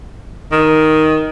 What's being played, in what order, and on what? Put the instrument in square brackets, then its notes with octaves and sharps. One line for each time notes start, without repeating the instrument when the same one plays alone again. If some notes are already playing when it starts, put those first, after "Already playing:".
[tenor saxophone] D#3